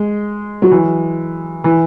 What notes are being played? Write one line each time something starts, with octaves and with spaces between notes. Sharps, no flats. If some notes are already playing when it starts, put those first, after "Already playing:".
Already playing: G#3
F#3
E3
E3